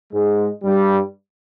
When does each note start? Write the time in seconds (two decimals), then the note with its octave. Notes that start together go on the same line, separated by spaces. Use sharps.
0.13 G#2 G#3
0.64 G2 G3